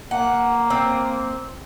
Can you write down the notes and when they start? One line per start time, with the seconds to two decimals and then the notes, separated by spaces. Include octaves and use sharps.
0.11 A#3 F#5
0.70 C4